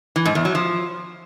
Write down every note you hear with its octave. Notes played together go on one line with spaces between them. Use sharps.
E3
G#2
E2
F#3
F3